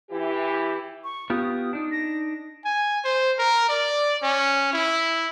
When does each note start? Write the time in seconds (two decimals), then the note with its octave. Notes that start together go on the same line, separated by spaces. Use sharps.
0.11 E3 E4 G4
1.04 C#6
1.30 B3 F4 G4 D#6
1.73 D4 D#4
1.91 A#6
2.65 G#5
3.04 C5
3.39 A#4
3.69 D5
4.23 C#4
4.73 E4